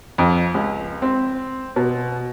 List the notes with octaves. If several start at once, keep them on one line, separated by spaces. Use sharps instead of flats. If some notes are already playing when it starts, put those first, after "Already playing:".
F2
C#2
C4
B2